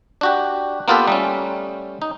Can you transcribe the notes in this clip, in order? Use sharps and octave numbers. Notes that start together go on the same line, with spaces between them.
D4 F#4 G4
A#3 B3 F4 G4 A4 B4
G3 A3 C#4
D#4